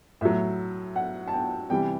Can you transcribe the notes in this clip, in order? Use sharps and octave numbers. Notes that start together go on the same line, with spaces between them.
A2 F#3 E5
F#5
A5
G5
C3 E3 G3 G5